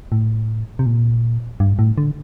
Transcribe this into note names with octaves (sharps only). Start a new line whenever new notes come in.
A2
C3
A#2
G2
A2
D3